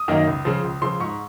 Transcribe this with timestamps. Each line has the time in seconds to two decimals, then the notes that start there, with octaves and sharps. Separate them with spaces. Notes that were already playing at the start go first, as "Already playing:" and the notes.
Already playing: D#6
0.08 F#2 D#3 A#3 D#4
0.27 C#2
0.45 C#3 F3
0.64 C#2
0.82 C#3 F3 C6
1.00 G#2 C#6